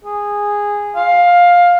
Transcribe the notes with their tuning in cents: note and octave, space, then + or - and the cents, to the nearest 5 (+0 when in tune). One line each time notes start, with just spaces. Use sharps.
G#4 -10
F5 +15